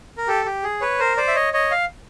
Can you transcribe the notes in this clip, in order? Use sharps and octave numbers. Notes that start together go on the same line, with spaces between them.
A#4
G4 A4
G4
G#4
B4 C#5
A#4 C5
C5 D5
E5
C#5 D#5
C#5 D#5
F5